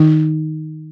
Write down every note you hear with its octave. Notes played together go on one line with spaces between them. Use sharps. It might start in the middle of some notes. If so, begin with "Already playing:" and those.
Already playing: D#3 D#4